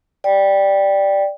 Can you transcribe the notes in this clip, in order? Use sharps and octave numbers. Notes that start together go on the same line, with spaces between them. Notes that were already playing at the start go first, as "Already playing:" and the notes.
D5 G5